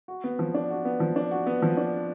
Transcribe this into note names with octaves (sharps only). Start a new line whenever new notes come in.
F#4
B3
F3
D4
F#4
B3
F3
D4
F#4
B3
F3
D4